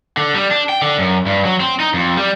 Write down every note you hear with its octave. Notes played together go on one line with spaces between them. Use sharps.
D3
G3
D4
G5
D3
F#2
G2
F#3
C4
D#4
F2
G3